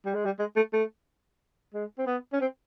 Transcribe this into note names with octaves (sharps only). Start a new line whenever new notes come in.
G3
G#3
G3
G#3
A3
A3
G#3
C4
B3
C#4
C4